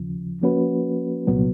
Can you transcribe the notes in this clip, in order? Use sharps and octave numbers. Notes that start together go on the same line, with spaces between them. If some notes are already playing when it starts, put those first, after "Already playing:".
Already playing: D#2 C#3 F3
F3 A#3 C#4 F#4 B4
C2 A#2 F#3 B3